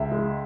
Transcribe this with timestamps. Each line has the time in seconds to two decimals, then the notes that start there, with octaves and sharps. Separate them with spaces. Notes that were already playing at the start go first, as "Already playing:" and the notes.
Already playing: C#2 E5
0.12 G#3